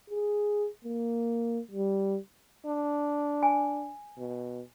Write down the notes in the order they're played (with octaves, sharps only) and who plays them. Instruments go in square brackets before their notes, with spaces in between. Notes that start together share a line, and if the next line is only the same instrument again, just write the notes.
[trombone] G#4
A#3
G3
[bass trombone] D4
[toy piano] G#5
[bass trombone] B2